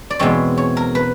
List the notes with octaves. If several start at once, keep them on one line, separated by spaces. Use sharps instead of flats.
D5
E2 B2 G#3 C4 C#5
C#5
A#4
B4